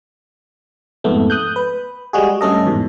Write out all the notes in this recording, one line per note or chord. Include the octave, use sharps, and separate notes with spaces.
F2 G#2 A3 B3
D#6 F#6 G6
B4
G3 G#3 F#4 G#4
G2 A3 C#4 A4 D#5
E2 G#2 B2